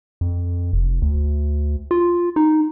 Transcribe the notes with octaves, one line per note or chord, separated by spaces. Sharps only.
F2
F1
D2
F4
D#4